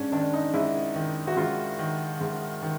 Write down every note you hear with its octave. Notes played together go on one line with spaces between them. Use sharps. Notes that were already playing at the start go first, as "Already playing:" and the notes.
Already playing: G#2 C#4 D4
D#3 D4
D#4
G#2 E4
D#3
F#4
G#2 F4
D#3
G#2
D#3